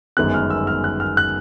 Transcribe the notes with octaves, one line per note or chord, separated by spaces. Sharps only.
G1 F#2 D#3 G#3 B3 F#6
F6
E6
F6
F#6
F6
F#6